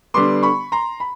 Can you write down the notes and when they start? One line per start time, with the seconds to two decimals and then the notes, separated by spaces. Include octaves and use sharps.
0.14 D3 G3 B3 C6 D6
0.43 B5 C#6
0.72 A#5 C6
1.00 B5